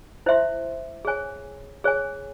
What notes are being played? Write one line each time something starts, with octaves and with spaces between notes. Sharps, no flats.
E4 C5 E5 C6
G#4 C#5 G#5
G#4 C#5 G#5